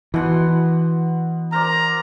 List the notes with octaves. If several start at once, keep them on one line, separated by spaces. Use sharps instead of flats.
B2 E3 F#5 C6
A#4 C5 D5 A#5